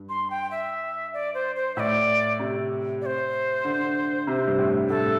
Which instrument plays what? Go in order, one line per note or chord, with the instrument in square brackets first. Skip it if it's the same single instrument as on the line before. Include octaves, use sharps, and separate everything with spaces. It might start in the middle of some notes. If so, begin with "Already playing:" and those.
Already playing: [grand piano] G2
[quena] C6
G5
E5
D5
C5
C5
[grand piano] A2 [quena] D5 E5
[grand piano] C3
[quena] D5
C5
[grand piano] D3
C3
G2
A2
[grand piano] A2 [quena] A4